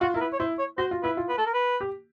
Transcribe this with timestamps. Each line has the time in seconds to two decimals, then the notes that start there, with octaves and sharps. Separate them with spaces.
0.01 F4 F#4
0.14 E4 A#4
0.21 B4
0.33 C#5
0.39 E4 C5
0.59 C#5
0.78 F#4 C5
0.91 F4
1.03 E4 B4
1.17 F4
1.29 B4
1.38 A4
1.46 A#4
1.54 B4
1.81 G4